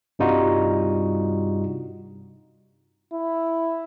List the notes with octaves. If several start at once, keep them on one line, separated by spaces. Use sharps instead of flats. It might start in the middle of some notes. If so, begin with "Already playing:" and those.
G2 C3 G3 D#4 F4 F#4
E4